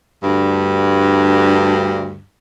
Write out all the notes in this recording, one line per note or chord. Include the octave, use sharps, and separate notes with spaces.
D2 G2